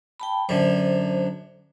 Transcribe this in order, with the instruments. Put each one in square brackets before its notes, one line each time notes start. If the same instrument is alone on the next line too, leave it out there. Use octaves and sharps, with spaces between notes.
[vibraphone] G5 A5 B5
[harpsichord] F#2 D3 [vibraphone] C5